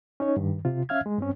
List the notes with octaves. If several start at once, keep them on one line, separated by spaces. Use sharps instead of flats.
C#4 D#4 C#5
G2 D#3
C3 F4
C#4 E5 F5 F6 G#6
G#3
G2 C4 C#4